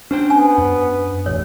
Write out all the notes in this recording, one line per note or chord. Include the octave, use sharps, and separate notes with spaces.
C#4 D4 C5 G5
B3 G#5
F#2
E1 A1 C#5